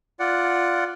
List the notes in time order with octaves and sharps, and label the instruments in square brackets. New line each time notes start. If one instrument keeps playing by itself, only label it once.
[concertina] F4 D5 F#5